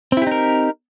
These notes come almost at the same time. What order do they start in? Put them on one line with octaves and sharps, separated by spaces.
C4 E4 G4 D#4 A#4